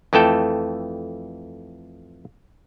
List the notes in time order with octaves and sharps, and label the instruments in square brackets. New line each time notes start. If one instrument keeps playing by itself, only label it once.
[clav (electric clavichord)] F2 E3 A3 A4 G5